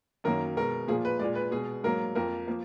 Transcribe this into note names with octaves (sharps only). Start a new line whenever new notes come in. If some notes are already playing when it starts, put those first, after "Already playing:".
F#2 D#3 F#3 A#3 A#4
B2 G#3 A#4
A#2 F3 A#3 G#4
B4
A#2 G#3 D5
B4
B2 G#3 G#4
G#2 F#3 A#3 A#4
F2 F3 A#3 A#4
F3 A#3